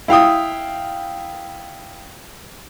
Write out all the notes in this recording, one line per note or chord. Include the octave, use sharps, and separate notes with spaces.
E4 F5 G5 D#6